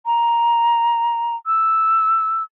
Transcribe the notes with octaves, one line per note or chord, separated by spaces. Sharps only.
A#5
E6